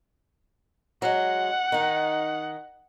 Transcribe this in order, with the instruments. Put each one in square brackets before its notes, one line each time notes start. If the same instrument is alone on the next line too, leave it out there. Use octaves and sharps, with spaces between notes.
[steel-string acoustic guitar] F#3 G#3 [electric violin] F#5
[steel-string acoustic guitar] D#3 D#4